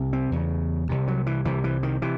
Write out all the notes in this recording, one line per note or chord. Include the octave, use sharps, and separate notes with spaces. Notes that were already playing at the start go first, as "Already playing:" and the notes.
Already playing: C2 C3
C4
E2 C#3
C2 C3
F#3
E3
C2 C3 E3
E3
D#3
C3 E3